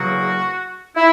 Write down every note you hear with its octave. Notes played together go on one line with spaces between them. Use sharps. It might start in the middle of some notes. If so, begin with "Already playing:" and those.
Already playing: E2 C#3 F#3 A#3 F#4
E4